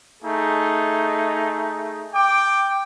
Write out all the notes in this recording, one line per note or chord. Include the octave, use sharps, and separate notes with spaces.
A3 D#4 G#4
G5 D6